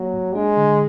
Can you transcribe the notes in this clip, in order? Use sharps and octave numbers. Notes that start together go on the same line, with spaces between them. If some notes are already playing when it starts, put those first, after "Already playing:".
Already playing: F#3 A#3
G#2
G#3 D4
D3